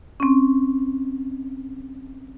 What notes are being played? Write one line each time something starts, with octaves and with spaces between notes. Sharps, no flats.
C4 C#4